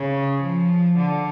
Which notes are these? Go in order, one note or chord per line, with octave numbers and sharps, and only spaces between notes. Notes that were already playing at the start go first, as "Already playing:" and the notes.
Already playing: C#3
F3
D3